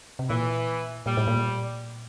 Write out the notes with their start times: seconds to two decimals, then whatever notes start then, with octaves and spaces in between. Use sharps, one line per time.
0.19 C3
0.29 A#2 E3
1.06 A#2 G3
1.17 A2
1.27 A#2